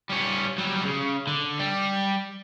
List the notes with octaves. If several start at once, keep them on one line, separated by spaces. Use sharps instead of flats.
G3 C#4
F#3 G3
C#3
D3
G3